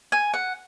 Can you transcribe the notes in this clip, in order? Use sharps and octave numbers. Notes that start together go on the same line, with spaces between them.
G#5
F#5